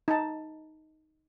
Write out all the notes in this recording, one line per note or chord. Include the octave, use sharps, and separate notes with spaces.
D#4 A5